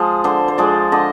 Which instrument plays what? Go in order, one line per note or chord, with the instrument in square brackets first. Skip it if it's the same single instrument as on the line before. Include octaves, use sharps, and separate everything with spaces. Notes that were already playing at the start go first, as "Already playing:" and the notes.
Already playing: [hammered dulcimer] F3 G#3
D3 C5
C5
F3 G#3 D5
D3 D#5